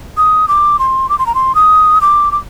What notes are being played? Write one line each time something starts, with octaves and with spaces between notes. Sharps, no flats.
D#6
D6
C6
D6
C6
A#5
C6
D#6
D6
D6